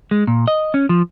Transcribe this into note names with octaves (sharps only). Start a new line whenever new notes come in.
G#3
A#2
D#5
C#4
F3